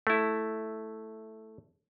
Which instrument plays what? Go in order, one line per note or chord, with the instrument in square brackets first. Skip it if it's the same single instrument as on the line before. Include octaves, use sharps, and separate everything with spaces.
[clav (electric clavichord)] A3 E4